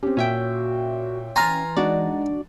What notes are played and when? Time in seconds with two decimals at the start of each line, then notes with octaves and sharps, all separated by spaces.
0.03 C4 C#4 G4
0.17 A#2 C#4 F#4 E5 G5
1.36 E3 G#5 A#5 C6 F6 A6
1.77 G#3 D4 D#4 F#4 D5 F#5